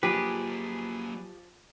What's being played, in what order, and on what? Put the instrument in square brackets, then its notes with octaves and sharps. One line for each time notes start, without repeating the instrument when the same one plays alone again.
[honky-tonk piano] F3 [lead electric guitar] F#3 A#3 [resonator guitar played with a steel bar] G4 [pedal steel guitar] G#4 B4